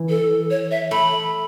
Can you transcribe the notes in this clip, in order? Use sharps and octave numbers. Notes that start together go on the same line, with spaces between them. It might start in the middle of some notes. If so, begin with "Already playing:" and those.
Already playing: E3
A4
C#5
E5
A3 B5